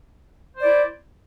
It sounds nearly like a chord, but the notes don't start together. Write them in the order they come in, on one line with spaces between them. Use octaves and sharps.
C5 D5 E4